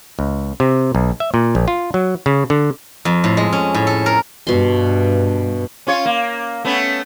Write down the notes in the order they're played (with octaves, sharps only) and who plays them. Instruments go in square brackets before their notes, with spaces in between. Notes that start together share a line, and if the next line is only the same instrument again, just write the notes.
[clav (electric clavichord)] C#2
C3
B1
E5
A#2
A#1
F4
F#3
C#3
D3
[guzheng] F2
A2
G#3
C#4
A2
A4
A#4
[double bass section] G2 [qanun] B2 C6
[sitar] C#4 F4 C#5
A#3
A3 B3 C#4